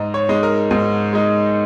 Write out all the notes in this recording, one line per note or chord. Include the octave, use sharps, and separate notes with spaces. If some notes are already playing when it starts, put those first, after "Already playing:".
Already playing: G#2 D#5
C#5
G#3 D#4
A#4
G#2
G#3 D#4